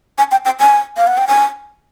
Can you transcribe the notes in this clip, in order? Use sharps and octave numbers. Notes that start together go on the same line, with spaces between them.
G#5
G5
G5
G#5
F5
F#5
G5
G#5